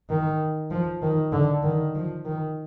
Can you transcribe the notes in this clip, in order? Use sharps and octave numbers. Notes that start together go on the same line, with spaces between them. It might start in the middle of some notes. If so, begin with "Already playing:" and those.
D#3
F3
D#3
D3
D#3
F3
D#3